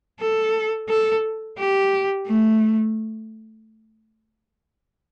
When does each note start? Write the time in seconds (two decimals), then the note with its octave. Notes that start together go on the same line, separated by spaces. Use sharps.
0.21 A4
0.90 A4
1.58 G4
2.28 A3